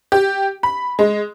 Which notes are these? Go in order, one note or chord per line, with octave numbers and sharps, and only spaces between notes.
G4
B5
G#3